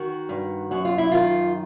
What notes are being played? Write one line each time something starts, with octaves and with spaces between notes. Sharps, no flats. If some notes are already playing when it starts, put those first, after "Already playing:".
Already playing: D#3 F#4
G2
F#2 F#4
F4
E4
D#3 F4